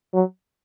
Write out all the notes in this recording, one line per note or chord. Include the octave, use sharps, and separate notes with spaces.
F#3